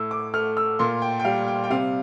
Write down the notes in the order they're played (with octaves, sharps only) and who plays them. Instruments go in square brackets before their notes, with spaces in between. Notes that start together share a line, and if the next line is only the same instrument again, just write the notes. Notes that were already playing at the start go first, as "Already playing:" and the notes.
Already playing: [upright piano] A2 E6
D6
A3 F6
E6
A#2 C6
G5
G5
G3 F5
G5
G5
C3 F5